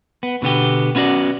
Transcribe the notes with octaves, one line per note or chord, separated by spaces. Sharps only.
B3
B2 D3 B3 G4
B3 C#4 E4 F#4 D5